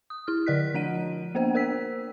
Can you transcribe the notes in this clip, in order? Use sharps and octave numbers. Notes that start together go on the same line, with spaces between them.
D#6
E4 F6
D3 D5 D#5 F#6 B6
F3 D4 F#5 D#7
A#3 B3 D4 C5 G5
A#4 C5 E6 B6